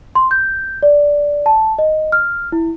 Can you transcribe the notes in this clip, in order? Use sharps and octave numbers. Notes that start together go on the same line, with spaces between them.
C6
G6
D5
A5
D#5
F6
E4